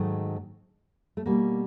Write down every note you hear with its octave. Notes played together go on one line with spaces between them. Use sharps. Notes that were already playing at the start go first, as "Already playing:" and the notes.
Already playing: G#2 D#3 F#3 A3
A3
B2 G3 A#3